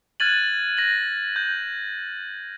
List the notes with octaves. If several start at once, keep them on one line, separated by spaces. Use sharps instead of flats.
F6 F#6 G#6 A6 D#7 F#7
A#6 F#7
G6